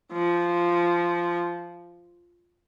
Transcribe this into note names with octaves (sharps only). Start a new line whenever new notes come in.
F3